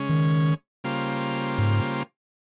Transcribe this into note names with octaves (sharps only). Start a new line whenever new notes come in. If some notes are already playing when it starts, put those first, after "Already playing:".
Already playing: C#3 G#3 C#4
D#3
C#3 G3 A#3 F4 C5
G#2